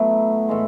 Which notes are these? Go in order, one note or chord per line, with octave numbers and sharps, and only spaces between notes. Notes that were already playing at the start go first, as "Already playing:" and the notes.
Already playing: F#3 A3 B3 E4
A2 E3 G#3